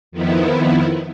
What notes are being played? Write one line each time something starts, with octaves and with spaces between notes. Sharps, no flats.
F2 D#3 F3 B3 E4